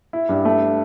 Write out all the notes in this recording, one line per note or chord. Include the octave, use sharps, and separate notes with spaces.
E4
G2
A3